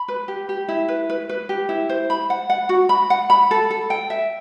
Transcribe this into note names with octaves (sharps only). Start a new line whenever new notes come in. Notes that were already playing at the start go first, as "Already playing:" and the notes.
Already playing: B5
B4
G4
G4
E4
B4
B4
B4
G4
E4
C5
B5
F#5
F#5
F#4
B5
F#5
B5
A4
A4
G5
E5